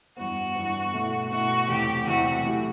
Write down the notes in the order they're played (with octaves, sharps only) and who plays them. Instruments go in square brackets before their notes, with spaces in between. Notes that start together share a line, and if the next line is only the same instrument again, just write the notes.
[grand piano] G2 E3 B3 [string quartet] F#4
[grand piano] G2 E3 B3
B2 A3 E4 A4
[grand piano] B2 A3 E4 A4 [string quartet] F#4
[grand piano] E2 C3 F#3 A3 E4 [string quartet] G4
[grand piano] E2 C3 F#3 A3 E4 [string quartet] F#4
[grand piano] E3 A3 E4 G4